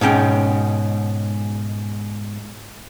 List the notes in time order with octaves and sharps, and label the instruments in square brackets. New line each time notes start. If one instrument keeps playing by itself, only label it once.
[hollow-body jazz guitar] G#2 B2 C#4 G5